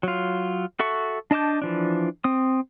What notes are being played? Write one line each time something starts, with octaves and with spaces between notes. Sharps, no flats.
F#3 F4
F#4 A4 E5 C#6
D4 D#5 A5 D6 G6
E3 F3 D4
C4 D#6